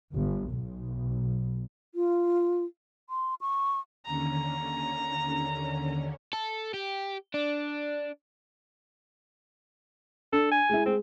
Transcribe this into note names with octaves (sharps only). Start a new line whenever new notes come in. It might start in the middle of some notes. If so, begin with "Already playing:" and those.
G1
B1
F4
C6
C#6
D#2 D3 C#4 A#5
A4
G4
D4
D4 A4
G#5
G#3 E4
G#3 C4